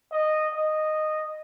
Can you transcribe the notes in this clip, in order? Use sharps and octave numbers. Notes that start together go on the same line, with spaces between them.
D#5
D#5